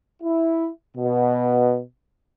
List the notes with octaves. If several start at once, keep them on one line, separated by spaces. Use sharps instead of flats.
E4
B2